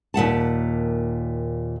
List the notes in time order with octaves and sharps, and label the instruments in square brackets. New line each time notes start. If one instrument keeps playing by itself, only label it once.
[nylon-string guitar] D#2 A#2 F#5 A5